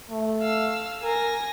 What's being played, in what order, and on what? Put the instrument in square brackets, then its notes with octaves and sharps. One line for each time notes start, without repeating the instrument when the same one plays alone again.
[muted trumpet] A3
[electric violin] F5 E6
[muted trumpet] A#4 [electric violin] G#5 A#6